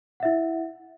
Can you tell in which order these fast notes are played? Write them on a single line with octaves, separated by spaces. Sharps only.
F#5 E5 E4